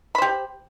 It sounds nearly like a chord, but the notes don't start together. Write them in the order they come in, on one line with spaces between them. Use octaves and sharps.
B5 C5 G4